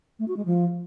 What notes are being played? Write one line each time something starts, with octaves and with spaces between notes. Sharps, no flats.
A3
F#4
G#3
F3